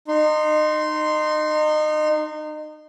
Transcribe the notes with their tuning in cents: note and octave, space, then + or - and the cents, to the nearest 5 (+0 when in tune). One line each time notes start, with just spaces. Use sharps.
D#4 -25 C6 +0